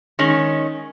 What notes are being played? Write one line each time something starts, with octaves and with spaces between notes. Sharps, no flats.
D#3 G#3 C#4